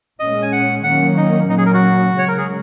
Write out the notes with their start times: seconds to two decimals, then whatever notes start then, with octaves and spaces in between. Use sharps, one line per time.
0.19 A#2 G#3 C#4 D#5
0.42 G#5
0.52 F#5
0.84 D#3 F#3 A#3 C#4 F#5
1.17 D#4
1.49 A#2 F#3 A#3 C#4 D#4
1.58 G#4
1.66 A#4
1.74 F#4
2.15 C#3 G#3 C#4 C#5
2.28 A#4
2.38 G#4